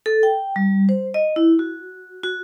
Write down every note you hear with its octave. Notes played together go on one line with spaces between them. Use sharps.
A4
G5
G3
C5
D#5
E4
F#4
F#4